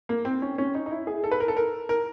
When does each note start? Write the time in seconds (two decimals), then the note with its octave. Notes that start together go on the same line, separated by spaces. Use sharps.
0.09 A#3
0.25 C4
0.42 C#4
0.58 C#4
0.75 D#4
0.86 D#4
0.91 E4
1.07 G#4
1.24 A4
1.31 B4
1.40 A#4
1.48 A4
1.57 A#4
1.89 A#4